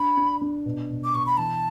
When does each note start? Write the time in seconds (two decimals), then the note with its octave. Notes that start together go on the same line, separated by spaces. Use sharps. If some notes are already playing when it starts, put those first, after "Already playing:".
Already playing: D4 B5
0.17 D4
0.41 D4
0.65 B2
0.90 B2
1.04 D6
1.14 B2 C#6
1.26 B5
1.37 E3 A5